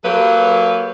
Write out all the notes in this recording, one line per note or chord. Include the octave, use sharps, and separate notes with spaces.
F#3 A#3 G4 A4 B4